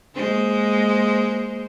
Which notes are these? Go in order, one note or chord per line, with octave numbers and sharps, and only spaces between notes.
G#3 A#3 C5